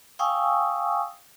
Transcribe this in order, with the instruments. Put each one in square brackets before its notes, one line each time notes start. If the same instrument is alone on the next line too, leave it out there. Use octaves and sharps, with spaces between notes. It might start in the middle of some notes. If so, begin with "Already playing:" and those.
[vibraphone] F5 G5 G#5 C#6 D#6 E6